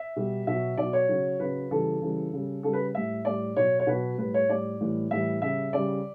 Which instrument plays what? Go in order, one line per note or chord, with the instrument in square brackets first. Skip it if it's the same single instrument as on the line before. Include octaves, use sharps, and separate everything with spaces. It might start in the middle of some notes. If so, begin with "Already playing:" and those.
Already playing: [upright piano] E5
B2 G3
B2 F#3 E5
B2 F#3 D5
C#5
C#3 F#3
C#3 F#3 B4
C#3 E3 G3 A4
C#3 E3 G3
C#3 G3
C#3 G3 A4
B4
A2 G3 E5
A2 G3 D5
B2 F#3 C#5
C#5
B2 F#3 B4
A2 G3 B4
C#5
A2 G3 D5
A2 E3 G3
A2 E3 G3 E5
C#3 G3 E5
C#3 G3 D5